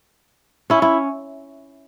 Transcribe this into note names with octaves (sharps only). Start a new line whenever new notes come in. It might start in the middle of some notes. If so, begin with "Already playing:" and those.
C#4 E4
E4